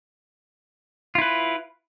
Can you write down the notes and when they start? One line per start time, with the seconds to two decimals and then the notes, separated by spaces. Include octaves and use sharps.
1.15 F4
1.18 E4
1.22 B4